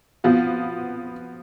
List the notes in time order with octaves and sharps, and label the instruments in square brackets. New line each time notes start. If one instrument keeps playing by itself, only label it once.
[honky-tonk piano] F3 B3 F#4